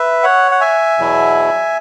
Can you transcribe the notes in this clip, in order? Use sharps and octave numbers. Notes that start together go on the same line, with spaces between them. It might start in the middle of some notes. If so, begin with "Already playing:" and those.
Already playing: B4 E5
C#5 F#5
F#5
E5 G#5
E2 B2 F#3 E4